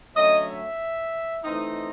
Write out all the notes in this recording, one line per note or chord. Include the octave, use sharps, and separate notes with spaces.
D3 F#3 A3 C#4 D#5
E5
E3 A3 C4 D#4